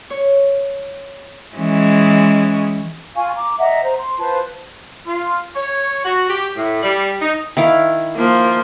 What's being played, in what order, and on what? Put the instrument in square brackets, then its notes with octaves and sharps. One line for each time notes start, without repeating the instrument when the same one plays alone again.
[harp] C#5
[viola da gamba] E3 G#3 C#4
[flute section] F4 F5 G#5 C#6
A#5 D6
D#5 E5 F#5 A#5
C5 A#5
C6
F4 B4 C5 A5
[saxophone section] F4
C#5
F#4
G4
A2
G3
D#4
[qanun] D#3 E4 F5
[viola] F3 A#3